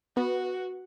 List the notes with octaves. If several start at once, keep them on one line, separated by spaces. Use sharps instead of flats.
B3 F#4